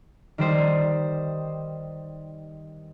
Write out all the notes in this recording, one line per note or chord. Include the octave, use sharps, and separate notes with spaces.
D#3 G3 C5 D#5